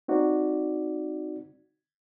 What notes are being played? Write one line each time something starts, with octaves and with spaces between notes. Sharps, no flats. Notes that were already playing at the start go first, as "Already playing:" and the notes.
C4 D#4 F#4 D5